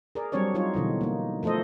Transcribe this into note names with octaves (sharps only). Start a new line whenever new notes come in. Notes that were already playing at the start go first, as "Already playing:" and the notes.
G#4 A#4 D5
F#3 G3 C4 D4 C#5 D5
F#3 D#4 F4 C#5
B2 D3 E3 D#5
A#3 D#4
F3 A3 A4 C5 D#5